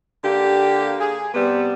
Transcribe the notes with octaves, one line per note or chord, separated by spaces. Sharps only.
D3 A#3 G4
G#4
C3 G3 B3